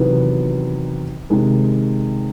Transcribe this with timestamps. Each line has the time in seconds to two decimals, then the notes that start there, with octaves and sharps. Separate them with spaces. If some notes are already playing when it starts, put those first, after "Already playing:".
Already playing: E2 C3 D#3 F#3 B3
1.30 C3 D#3 G#3